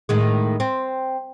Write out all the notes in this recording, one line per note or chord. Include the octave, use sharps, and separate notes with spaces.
A2 D#3 G#3
C4